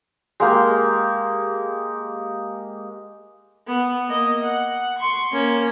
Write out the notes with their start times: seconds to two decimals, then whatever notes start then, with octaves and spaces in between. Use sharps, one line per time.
0.40 G#3 A#3 G4
3.67 B3
4.09 A#3 D#5
4.43 F#5
4.98 C6 C#6
5.32 A#3 C#4